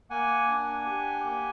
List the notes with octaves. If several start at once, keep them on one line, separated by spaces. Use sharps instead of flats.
A#3 F#5 G#5
D4
G4
A#3